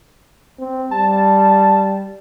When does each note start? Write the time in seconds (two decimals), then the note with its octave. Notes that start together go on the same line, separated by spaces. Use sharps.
0.59 C4
0.91 G3 A5